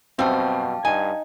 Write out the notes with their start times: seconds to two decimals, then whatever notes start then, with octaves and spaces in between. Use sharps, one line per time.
0.19 F#2 B2 G3 C4 F5 G5 A5
0.85 G2 D#4 G#5